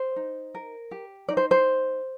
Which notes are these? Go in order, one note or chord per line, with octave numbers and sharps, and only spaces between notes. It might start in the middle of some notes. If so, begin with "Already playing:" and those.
Already playing: C5
D#4
A#4
G4
D#4 D5
C5
C5